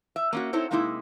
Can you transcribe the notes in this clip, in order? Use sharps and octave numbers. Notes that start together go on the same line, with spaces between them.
E5
A#3 C#4 F#4
C4 D#4 E4 A4 C5 C#5
C3 G#3 A#3 D#4 E4